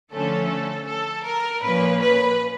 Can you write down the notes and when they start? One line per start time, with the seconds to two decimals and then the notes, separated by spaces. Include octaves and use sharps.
0.11 D3 F3 A3 C#4 A4
0.87 A4
1.24 A#4
1.62 A#2 F3 A#3 C#4 B4
2.01 B4